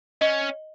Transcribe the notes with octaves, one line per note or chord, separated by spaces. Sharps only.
C#4 D#5